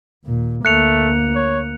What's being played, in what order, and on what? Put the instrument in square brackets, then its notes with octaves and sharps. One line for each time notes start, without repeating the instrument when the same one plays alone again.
[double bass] D#2 A#2
[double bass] D2 A#3 [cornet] A3 [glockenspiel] F#6 C#7 F7
[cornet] C#5